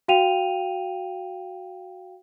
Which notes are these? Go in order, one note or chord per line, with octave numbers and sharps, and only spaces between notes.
F#4 F5 G5 D#7 F7